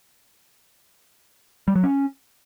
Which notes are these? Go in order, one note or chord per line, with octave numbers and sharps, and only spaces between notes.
G3
F#3
C#4